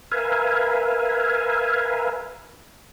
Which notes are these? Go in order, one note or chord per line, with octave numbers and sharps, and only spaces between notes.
A#4 B4 E5 F5 G#5